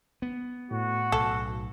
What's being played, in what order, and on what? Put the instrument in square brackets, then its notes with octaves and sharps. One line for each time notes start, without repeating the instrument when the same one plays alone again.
[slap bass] B3
[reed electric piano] A2 [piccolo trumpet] F#4
[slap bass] B1 [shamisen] A4